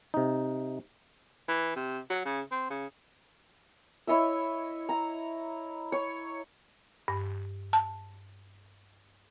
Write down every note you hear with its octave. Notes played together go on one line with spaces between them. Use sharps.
C3 D#4
E3
C3
F#3
C#3
C4
C#3
E4 C#5 D#5 E5
A#5
C#5
G2
A5